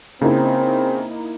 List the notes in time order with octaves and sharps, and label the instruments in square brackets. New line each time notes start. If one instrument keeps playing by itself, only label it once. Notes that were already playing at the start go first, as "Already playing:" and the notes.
[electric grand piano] C#3 [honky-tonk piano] A#3 D#4 E4 [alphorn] C4